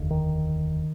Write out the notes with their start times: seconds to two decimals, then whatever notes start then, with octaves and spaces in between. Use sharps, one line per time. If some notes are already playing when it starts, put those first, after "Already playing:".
Already playing: F1 D#2 D3
0.11 D#3